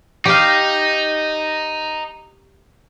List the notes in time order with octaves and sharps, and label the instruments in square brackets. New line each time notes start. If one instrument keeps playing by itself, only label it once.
[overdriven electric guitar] D#4 [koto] G4 F5